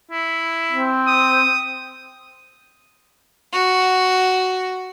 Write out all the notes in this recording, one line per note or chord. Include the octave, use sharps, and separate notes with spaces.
E4
C4
D#6
F#4